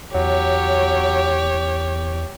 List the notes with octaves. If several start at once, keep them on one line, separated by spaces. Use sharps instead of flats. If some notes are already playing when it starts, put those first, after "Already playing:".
E2 F#3 G4 C#5